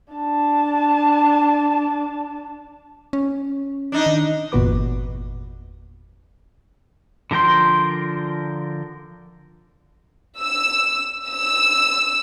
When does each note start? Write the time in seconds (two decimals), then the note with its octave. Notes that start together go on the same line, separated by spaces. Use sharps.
0.13 D4 A5
3.13 C#4
3.92 D4 D#4
4.06 D#3
4.52 G1 E2 A#2 F#4 B4 D6
7.31 D3 F3 A#4 G5 C6
10.42 E6
11.27 E6